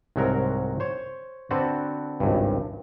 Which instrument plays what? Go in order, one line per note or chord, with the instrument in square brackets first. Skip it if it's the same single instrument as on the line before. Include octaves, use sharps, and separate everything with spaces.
[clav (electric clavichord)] C2 G#2 F#3 F#4 A#4
C5 C#5
D3 C4 F#4 A4 B4 C5
G#1 C#2 G2